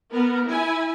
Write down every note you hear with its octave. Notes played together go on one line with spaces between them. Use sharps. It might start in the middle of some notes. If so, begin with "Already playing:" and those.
B3 A#4
E4 G#5